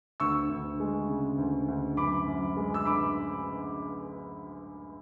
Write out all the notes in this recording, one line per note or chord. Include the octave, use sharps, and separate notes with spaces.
D2 C#6 E6
D2
G#3
C#3
D2
D2
F#2 B5 D6
F#2
G#3
E6
D3 B5 D6